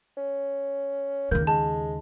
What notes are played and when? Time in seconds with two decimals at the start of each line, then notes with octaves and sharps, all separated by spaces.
0.17 C#4
1.31 D#2 C#3 A#3 G6
1.47 G#3 A5